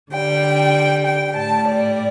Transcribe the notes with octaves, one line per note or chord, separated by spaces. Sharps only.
D3 G3 G5
G5
A2 G3 A5
D5